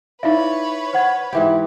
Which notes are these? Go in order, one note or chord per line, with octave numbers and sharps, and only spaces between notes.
D#4 E4 B4 C#5 D5 E5 F5
C5 F#5 G#6
G#2 E3 G4